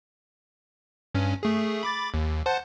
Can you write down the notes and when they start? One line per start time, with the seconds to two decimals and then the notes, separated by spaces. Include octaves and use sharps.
1.15 G2 C#4
1.43 A3 G#4
1.83 B5 D6 A6
2.14 D#2
2.46 C5 F#5 A5